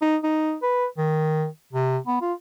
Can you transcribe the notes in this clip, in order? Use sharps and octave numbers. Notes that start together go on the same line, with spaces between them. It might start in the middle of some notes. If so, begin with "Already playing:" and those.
D#4
D#4
B4
D#3
C3
B3
F4